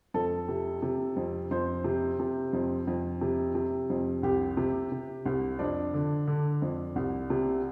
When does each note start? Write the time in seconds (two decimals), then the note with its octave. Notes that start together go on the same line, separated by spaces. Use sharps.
0.14 F2 A4
0.49 C3
0.83 C3
1.16 F2
1.51 F2 C5
1.84 C3
2.20 C3
2.53 F2
2.87 F2
3.21 C3
3.55 C3
3.90 F2
4.23 C2 G4
4.57 C3
4.92 C3
5.26 C2
5.59 F2 D4
5.94 D3
6.27 D3
6.62 F2
6.96 C2
7.30 C3